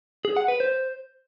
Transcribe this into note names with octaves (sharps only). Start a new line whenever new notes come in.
G#4
F#5
B4
C5